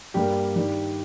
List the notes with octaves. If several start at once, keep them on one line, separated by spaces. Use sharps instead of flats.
G2 G3 A#3 G4
G2 D#3 G3